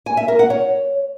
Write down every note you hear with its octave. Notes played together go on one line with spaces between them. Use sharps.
G#5
E5
A#4
F#5
C#5